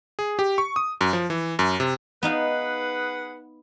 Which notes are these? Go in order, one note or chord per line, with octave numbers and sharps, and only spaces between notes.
G#4
G4
C#6
D#6
F#2
F3
E3
F#2
C3
B3 D#4 G#4 B4 F5 F#5